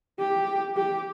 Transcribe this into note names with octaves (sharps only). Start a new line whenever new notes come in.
G4
G4